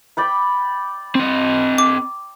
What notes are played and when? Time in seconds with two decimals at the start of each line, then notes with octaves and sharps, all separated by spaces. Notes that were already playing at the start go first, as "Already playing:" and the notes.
0.17 D5 G5 B5
1.15 C4 D#5
1.78 D6